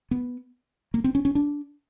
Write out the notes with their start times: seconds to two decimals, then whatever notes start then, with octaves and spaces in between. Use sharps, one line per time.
0.11 B3
0.94 A#3
1.04 C4
1.15 C#4
1.25 C#4
1.35 D4